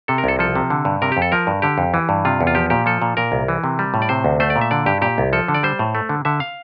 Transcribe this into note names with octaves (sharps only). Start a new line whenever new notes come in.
C3 A4
A#4
C2 A4
F3 A4
C3
D3
G2
C3 A#4
G4
F2
A4
F3 A#4
G2
D3 G4
F2
E3
G2
C3 F4
E2
F4
F3 G4
A#2 G4
F3 A4
A#2
A#2 A#4
C2
E3
C3
G3
A2
D5
C3 C5
D2
A3 C5
D5
A#2
E5
D3 D5
G2 G4
A#2 G4
C2
F3 A4
D3
D5
G3 C5
A2
A3
D3
D3 E5
F5